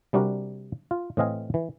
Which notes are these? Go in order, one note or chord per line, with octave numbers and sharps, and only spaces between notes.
C3 G3 D4 F#4 A#4
F4
A2 E3 C4 D#5 F5 G#5
E3